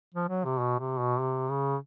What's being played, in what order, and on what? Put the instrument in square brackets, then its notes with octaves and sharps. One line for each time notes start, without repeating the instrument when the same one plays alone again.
[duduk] F3
F#3
C3
B2
C3
B2
C3
C#3